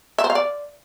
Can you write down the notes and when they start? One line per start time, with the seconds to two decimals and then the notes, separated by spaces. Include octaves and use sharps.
0.18 E5
0.24 C5
0.30 F5
0.35 D5